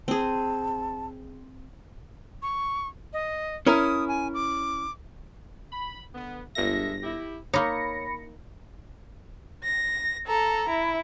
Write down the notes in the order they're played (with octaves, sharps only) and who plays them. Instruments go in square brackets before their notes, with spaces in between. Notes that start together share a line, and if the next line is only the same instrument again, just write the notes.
[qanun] C4 G#4 [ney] A5
[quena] C#6
D#5
[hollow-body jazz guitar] C#4 E4 A#4 [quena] D#6
[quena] G#5
D6
[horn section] B5
D3 B3
[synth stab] G1 A#6 [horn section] G#3 A4 E5
[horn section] E4 G4
[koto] A#3 D#4 [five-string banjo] C#5 [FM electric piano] B5 A#6 C#7
[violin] A#6
A4 A#5
E4